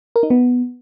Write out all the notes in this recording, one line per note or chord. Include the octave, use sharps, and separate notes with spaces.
A#4
D#4
B3